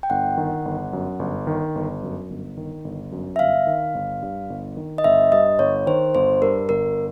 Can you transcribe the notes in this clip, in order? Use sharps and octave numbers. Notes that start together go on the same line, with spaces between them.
G5
G1 F#5
D#3
G1
F#2
G1
D#3
G1
F#2
G1
D#3
G1
F#2
E5
G1 F5
D#3
G1
G2
G1
D#3
D#5
G1 E5
G2 D#5
G1 C#5
D#3 C5
G1 C5
G2 A#4
G1 A#4